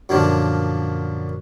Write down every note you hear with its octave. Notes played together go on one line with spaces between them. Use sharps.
F#2 A#2 D3 F3 D4